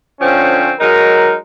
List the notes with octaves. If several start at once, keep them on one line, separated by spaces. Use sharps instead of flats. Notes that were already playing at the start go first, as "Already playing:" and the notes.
D3 F3 C4 C#4
F#3 G#3 D#4 A#4